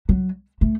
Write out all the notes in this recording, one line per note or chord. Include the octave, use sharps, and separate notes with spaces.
F#3
A3